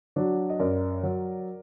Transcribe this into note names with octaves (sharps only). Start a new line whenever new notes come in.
F#3 D4 F#4
D#5
F#2 A#4 D5
F#3